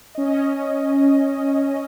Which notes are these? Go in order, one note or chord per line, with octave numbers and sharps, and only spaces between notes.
C#4 D#5